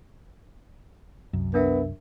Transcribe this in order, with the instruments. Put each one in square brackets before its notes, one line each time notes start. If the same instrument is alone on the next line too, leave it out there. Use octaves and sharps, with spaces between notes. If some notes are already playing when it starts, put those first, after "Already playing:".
[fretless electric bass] C2 F#2
[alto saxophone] B3 [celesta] D4 A#4 E5